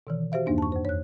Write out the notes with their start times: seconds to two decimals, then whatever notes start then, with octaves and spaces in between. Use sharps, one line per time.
0.07 B2 D#3 E3
0.32 F#4 G4 C5 E5 F5
0.46 E2 G2 A#3 D4 D#4
0.58 A5 C#6
0.72 F2 C5
0.85 C#5 F#6